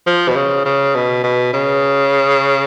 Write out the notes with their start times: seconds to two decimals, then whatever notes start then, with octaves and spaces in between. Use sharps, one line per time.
0.07 F3
0.29 B2
0.36 C#3
0.65 C#3
0.95 B2
1.24 B2
1.53 C#3